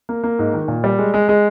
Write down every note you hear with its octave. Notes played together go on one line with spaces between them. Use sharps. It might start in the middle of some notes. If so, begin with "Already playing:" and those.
A#3
A#3
G#2
D#3
A#2
G3
G#3
G#3
G#3